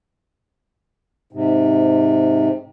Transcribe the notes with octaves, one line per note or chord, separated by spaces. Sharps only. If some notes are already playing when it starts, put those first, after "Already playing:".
G#2 C3